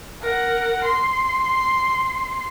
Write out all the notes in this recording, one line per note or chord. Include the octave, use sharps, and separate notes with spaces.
A#4 F#5
C6